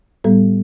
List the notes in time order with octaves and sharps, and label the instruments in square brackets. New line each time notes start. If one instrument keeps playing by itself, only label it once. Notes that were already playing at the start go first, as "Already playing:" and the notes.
[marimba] A2 G3 B3 A4